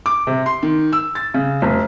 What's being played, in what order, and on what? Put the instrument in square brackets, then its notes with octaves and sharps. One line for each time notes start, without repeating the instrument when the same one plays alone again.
[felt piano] D6
C3
C6
D#3
E6
A6
C#3
F1